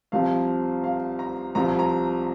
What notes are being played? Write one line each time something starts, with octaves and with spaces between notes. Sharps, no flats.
C2 C3 F3 F5
F5
A#5
C2 C3 F3 A#5
A#5